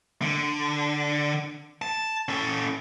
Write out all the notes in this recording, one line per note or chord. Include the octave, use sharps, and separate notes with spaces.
D3
A5
C#4 A4